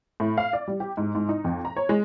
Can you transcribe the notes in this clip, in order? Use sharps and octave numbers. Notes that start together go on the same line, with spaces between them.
A2
F5
D5
G3
G4
G#2
G#2
D#4
F2
A#5
C#5
G#3